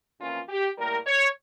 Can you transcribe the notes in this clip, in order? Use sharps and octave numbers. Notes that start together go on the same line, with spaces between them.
F2 E3 A#3 C#4 F4
G4
A2 G3 A#3 A#4
C#5